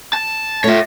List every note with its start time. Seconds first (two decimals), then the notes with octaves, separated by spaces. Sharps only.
0.13 A5
0.64 A3 F4 C#5 E5